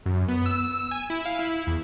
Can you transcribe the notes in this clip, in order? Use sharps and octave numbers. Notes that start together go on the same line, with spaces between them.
F#2
B3
E6
G#5
E4
F5
E4
E2